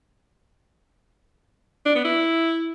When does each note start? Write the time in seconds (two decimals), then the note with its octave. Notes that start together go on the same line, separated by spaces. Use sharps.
1.86 D4
1.95 B3
2.05 E4